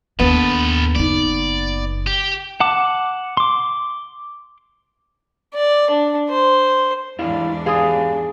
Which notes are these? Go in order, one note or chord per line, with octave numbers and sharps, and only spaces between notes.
D#2 B3 D4 A4 B4
F#1 D#4 D5
G4
F#5 A5 D6
C6 D6
D5
D4
C5
E2 G#2 G3 D4 E4 F5
G4 G#4 F5 D#6